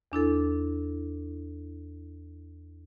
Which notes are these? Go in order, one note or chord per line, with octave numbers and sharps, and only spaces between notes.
E2 D4 E4 A4